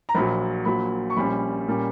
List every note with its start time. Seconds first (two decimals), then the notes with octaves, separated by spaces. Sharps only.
0.09 A#5
0.15 A#1 A#2 F#3 B5
0.65 A#1 A#2 F#3 B5
1.10 C#6
1.16 A#1 A#2 G3 C#4 B5
1.68 A#2 G3 A#3 C#4